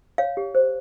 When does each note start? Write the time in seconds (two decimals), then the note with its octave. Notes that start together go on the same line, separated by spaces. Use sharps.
0.18 C#5 F5
0.37 G4
0.55 C5